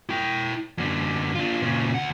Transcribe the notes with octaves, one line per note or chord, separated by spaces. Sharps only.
E4 G5
F#2 D3
D4 F4
A#2 C#3
D2 F#5